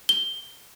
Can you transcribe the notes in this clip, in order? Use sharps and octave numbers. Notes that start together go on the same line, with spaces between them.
G7